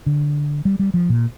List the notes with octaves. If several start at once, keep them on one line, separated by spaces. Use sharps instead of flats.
D3
G3
G3
F3
A#2